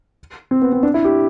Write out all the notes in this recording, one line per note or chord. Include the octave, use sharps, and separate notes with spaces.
C4
B3
C4
D4
E4
G4